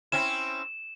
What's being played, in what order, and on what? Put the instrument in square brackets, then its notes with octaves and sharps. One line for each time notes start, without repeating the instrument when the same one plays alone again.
[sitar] C4 C#4 E4 [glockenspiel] E7